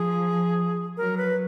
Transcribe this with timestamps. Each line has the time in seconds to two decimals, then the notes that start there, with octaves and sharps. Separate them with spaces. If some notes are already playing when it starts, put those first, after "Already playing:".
Already playing: F3 G#4
0.97 F#3 A#4
1.18 B4